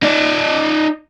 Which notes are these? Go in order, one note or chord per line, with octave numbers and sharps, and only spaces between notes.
D#4 D5